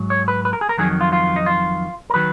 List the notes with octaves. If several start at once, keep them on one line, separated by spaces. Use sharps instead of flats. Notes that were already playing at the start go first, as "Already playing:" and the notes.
Already playing: G#2 F#3
C#5
B4
B4
A#4
G#4
A#4
F2 D#3 F#3 G#4
F4
F4
D#4
F4
A#4
D#3 F#3 B4